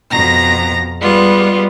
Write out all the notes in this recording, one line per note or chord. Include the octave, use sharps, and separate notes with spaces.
F2 B2 A#5 A#6
G3 G#3 B3 F4